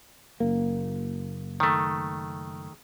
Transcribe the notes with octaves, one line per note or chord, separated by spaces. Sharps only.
F#1 A#3
D#3 A3